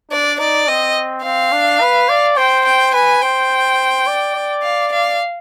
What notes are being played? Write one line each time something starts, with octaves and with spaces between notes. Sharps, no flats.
D4 D5
D#4 D5
C4 D#5
C4 F5
D4
B4
D5
C5 G5
G5
B4 G#5
C5 G5
D5
D5
F5
F5